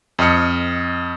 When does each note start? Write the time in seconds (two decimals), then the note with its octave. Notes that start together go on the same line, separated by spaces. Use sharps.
0.19 F2 D#5 D#6 F6 C#7